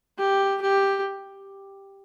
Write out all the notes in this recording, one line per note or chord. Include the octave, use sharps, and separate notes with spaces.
G4
G4